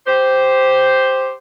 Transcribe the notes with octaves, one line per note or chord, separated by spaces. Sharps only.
G4 C5